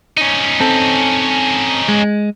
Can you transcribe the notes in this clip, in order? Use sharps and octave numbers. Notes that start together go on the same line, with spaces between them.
C#4 D#4
C4 A4
G#3